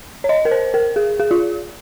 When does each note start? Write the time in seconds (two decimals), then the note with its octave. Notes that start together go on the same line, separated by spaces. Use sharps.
0.24 C#5
0.29 D#5
0.45 A#4
0.51 C5
0.74 A#4
0.96 G#4
1.20 G#4
1.31 F4